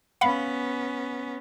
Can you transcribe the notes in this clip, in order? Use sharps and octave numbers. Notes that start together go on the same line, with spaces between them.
B3 C#4 F5 F#5 B5